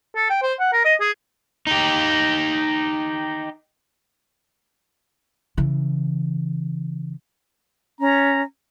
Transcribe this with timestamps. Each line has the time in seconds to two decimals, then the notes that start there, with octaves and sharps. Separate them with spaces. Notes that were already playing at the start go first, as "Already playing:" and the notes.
0.16 A4
0.30 G5
0.42 C5
0.60 F#5
0.73 A#4
0.85 D#5
1.00 G#4
1.67 D#4 G4
5.57 C#3 E3
8.00 C#4 A#5